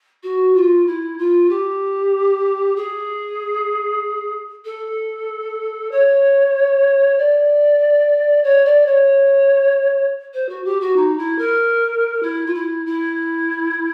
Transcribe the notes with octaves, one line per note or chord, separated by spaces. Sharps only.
F#4
F4
E4
F4
G4
G#4
A4
C#5
D5
C#5
D5
C#5
C5
F#4
G4
F#4
D#4
E4
A#4
E4
F4
E4
E4